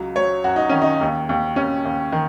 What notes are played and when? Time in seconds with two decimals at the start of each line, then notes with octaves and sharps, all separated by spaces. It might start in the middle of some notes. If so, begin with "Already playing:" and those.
Already playing: C#2 F#3
0.16 F#3 C#5
0.44 F#2 F#4
0.56 D#4
0.69 D#3 C#4
0.82 D#4
1.01 D#2
1.29 D#2
1.56 D#2 C#4
1.85 D#2
2.12 D#3